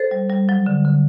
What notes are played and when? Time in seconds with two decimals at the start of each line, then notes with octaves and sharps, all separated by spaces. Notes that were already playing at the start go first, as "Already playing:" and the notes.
Already playing: A4 C5
0.11 G3
0.30 G3
0.49 F#3
0.66 D3
0.84 D3